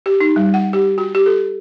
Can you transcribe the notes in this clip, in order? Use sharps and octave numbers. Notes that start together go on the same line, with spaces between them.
G4
D#4
G3
F#5
G4
F#4
G4
A4